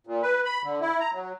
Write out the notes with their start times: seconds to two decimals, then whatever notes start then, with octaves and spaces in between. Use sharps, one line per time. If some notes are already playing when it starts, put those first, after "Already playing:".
0.07 A#2
0.22 B4
0.45 B5
0.64 D3
0.81 E4
1.00 A#5
1.13 F#3